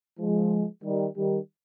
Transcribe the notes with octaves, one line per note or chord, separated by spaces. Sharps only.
F3 G#3
D#3 G3
D#3 G3